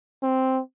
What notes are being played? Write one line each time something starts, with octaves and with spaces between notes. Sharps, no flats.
C4